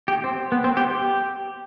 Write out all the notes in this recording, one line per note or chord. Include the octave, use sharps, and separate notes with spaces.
G4
C4
B3
C4
G4
G4